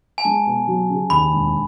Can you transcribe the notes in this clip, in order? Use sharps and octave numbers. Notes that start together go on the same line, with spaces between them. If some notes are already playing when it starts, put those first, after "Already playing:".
G#5
G#3 A5
B2
F#3
C#3
D#2 B5
E1